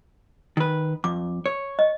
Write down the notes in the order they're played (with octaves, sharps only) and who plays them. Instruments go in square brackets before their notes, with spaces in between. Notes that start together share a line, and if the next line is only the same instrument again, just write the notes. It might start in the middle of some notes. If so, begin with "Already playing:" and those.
[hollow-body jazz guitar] D#3 B4
[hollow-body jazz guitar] F2 [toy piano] D6
[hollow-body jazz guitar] C#5
[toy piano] D#5